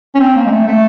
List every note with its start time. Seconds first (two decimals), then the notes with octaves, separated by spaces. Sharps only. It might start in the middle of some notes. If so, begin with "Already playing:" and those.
0.15 C#4
0.20 C4
0.36 A#3
0.46 G#3
0.51 A3
0.67 A3